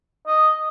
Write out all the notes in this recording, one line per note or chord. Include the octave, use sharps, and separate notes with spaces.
D#5